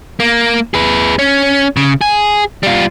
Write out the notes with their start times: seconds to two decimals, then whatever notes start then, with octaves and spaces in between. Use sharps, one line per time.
0.20 A#3
0.74 G#4 B4
1.19 C#4
1.77 C#3
2.01 G#4
2.63 G3 F4